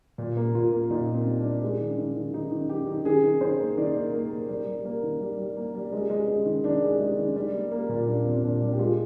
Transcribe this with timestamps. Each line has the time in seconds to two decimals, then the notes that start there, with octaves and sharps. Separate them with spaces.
0.18 A#2
0.37 A#3
0.55 A#2 F4
0.72 A#3
0.90 A#2 D#4
1.08 A#3
1.14 C4
1.26 G3
1.38 D4
1.44 G3
1.62 G#3
1.80 D#3
1.98 D#3
2.16 D#3
2.34 D#3 D#4
2.51 D#3
2.69 D#3 G4
2.87 D#3
3.05 D#3 G#4
3.23 D#3
3.41 D#3 C5
3.59 A#3
3.77 D#3 D5
3.95 A#3
4.14 A#3
4.31 A#3
4.49 G3 A#4
4.66 G3
4.85 A#3
5.03 D#3
5.20 G3
5.38 G3
5.56 A#3
5.74 G3
5.92 G#3
6.10 G#3
6.28 G#3
6.46 D#3
6.64 D#3 D4
6.83 G#3
6.99 G#3
7.18 D#3
7.36 G3
7.54 A#3
7.72 A#3
7.89 A#2
8.07 G3 D4
8.25 A#2 C4
8.43 A#2 D4
8.61 G3 D4
8.73 G4
8.79 G#3 F4